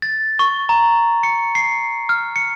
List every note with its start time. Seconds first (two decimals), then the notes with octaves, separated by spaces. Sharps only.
0.02 A6
0.39 C#6
0.69 A#5
1.23 C#7
1.55 C7
2.09 F6
2.36 C#7